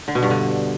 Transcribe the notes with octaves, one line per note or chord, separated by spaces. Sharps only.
D3
B2
G2
D3